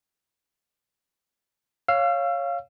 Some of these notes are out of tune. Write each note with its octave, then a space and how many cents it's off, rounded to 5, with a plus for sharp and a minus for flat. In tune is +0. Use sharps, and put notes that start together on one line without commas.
C#5 +0 F5 +0 E6 +40